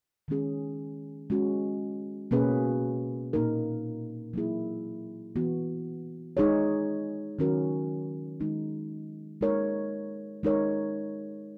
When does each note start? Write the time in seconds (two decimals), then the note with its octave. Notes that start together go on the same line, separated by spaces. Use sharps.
0.28 D#3 G#3 C#4 G#4
1.30 G#3 C#4 F#4
2.31 B2 A#3 C#4 G#4 B4
3.33 A#2 A#3 D#4 A#4
4.34 F#3 A#3 E4 G#4
5.36 E3 B3 F#4
6.37 G#3 D#4 G#4 C#5
7.39 D#3 F#3 C#4 F#4 A#4
8.40 D#3 G#3 D#4
9.41 G#3 D#4 A#4 C#5
10.43 G#3 D#4 A#4 C#5